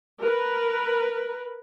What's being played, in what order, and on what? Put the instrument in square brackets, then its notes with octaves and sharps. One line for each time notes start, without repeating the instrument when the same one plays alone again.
[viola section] A#4 B4